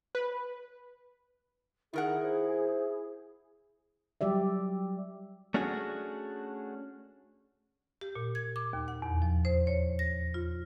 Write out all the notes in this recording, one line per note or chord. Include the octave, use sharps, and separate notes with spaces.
B4
D#3 D#4 E4 G#4 A#4 F#5
C5
F#3 G3 G4 D5 E5
A3 C#4 D4 F#4 G#4
G4
A#2
G#6
D6
D#2
F#5
E2
F3
C5
C#5
A#6
F4